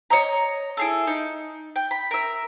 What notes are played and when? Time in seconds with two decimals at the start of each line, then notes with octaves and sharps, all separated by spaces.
0.10 C#5 D#5 A#5
0.77 E4 G#4 A4
1.07 D#4
1.76 G5
1.91 B5
2.11 A#4 E5